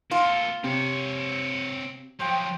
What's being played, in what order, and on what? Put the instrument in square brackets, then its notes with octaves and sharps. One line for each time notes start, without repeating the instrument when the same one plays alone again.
[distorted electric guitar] A#3 A4 [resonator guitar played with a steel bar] F4
[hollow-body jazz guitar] C3 [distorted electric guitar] C4 C#5
[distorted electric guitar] F3 F#3 [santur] C5 G5